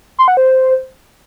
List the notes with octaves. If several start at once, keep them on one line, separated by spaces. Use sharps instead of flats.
C6
F#5
C5